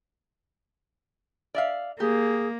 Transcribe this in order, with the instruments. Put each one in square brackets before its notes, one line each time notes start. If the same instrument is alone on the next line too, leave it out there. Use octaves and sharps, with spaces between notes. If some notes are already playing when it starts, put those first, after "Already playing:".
[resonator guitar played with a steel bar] D5 E5 F5
[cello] A#3 [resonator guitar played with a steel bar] G4 [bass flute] G#4